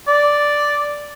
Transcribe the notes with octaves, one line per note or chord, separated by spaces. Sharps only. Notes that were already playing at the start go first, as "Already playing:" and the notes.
D5